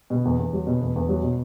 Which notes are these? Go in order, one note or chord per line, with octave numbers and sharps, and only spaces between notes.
B2
E2
E2
F#3
B2
E2
E2
F#3
B2